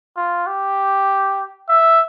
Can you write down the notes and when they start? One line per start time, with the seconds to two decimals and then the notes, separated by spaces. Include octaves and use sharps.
0.16 F4
0.46 G4
1.69 E5